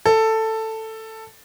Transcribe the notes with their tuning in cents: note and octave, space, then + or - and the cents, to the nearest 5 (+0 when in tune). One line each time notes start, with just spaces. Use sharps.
A4 +10